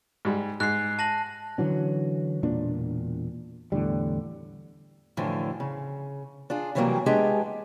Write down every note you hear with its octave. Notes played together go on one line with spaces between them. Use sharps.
G#2 G3
G#2 F#6 C7
A5 A#6 F#7
D3 E3 F#3 C#4
E1 A#2 D4
E2 A2 D3 G3
F#2 A2 D3 E3 F3
C#3
D4 F4 G#4
C3 E3 F#3 G3 A3 A#3
G#3 B3 D4 F4 G4 G#4